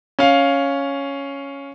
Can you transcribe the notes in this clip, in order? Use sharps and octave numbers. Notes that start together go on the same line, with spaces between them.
C#4 F5